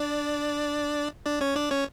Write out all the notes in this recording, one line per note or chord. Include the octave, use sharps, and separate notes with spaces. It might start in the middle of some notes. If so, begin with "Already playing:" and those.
Already playing: D4 D5
D4 D5
C#4 C#5
D4 D5
C#4 C#5